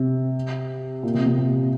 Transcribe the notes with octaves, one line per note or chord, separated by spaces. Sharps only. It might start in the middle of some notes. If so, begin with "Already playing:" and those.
Already playing: C3
A#2
C3
C3
C3